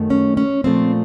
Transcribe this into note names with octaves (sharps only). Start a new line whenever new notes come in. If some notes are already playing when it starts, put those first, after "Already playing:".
Already playing: F#2 D#3 A3
C#4
C#4
A#2 F3 A3 C4